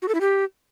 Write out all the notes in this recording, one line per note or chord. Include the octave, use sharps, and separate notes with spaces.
F#4
A4
E4
G4